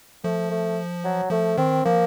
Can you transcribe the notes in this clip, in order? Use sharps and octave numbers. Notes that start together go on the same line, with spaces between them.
F3 A3
A3
F#3
F3 A3
D#3 C4
F3 A#3